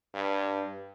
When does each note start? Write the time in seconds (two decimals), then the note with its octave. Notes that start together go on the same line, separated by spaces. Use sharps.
0.15 G2